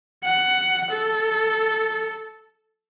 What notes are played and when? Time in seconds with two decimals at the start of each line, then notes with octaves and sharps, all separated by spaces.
0.24 F#5
0.90 A4